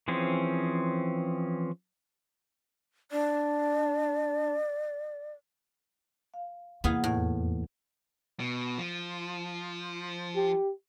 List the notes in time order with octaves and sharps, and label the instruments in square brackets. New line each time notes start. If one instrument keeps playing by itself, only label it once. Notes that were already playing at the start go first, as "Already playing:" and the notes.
[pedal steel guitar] E3 F3 C4 C#4 G#4
[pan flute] D4 [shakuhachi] D5
[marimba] F5
[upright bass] E2 [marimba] C3 A#3 E4 [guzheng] B3 G#4 F5
[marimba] F2 [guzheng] A2
[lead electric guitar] B2
F3
[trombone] G4